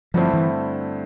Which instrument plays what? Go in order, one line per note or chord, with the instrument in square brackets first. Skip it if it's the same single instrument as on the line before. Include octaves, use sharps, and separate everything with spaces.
[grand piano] G2 D3 A3 C4 E4 [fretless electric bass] F3
[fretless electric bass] E3